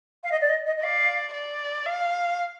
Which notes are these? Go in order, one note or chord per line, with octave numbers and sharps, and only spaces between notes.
F5
D#5
D5
D#5
D#5
D#5
D5 F5
D5
F5